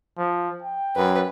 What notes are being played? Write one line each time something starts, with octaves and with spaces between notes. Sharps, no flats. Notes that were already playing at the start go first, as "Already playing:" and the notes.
F3
G5
F#2 B4